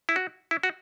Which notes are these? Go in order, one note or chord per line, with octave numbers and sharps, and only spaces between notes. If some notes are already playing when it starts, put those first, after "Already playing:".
E4
F#4
E4
F#4